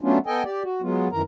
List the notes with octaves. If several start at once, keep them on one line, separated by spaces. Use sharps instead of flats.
F#3 A3 B3 C#4 D4 F4
B3 A4 D#5 G5 G#5
G4 D5
F#4
F#3 G#3 B3 F4
F#2 D#3 E3 A#4 A#5